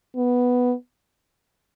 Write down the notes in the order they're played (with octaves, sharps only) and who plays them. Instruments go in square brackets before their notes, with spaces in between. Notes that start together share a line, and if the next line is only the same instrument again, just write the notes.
[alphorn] B3